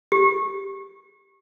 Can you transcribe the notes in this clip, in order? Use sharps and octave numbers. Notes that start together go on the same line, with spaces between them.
G4